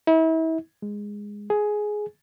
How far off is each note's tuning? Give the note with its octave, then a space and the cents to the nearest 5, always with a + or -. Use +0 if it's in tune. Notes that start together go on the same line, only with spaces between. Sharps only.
E4 -35
G#3 -10
G#4 +10